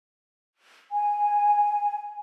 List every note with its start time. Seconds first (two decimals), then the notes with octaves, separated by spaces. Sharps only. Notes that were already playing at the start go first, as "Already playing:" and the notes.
0.92 G#5